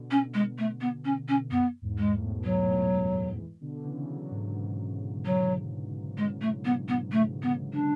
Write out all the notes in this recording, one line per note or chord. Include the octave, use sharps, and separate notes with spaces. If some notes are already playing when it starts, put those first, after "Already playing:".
Already playing: B2 D3
C#4
G#3
A3
B3
C#4
C#4
F#2 B3
E2 G#2
G#3
A2
B2
A2
B2 F#3
A2
B2
A2
B2
F#2 A2
E3 G#3
B2 D3
C#3 E3
D3 F#3
G#2 B2
F#3
G#3
A3
B3
B3
A3
B3
D4